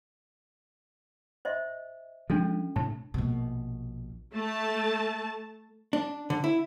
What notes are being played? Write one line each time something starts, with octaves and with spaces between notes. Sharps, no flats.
C5 D#5 E5
F3 G#3 C#4 D4 A4
A2 C3 A5
A#1 B2
A3 A5
D4
D3
E4